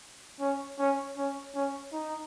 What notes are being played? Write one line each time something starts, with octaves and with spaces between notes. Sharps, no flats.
C#4
C#4
C#4
C#4
D#4